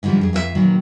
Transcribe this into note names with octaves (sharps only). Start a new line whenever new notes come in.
G#2 D3 E3 F3 G3
F2 G#4
F2 F4 G#4 E5
A#2 D#3 E3 F#3